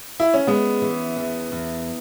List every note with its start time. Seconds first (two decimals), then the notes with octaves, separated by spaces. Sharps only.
0.20 E4
0.34 C#4
0.47 G#3 B3
0.82 E3
1.17 E2
1.52 E2